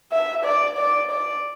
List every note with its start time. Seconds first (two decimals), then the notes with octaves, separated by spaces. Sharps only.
0.12 E5
0.45 D5
0.78 D5
1.11 D5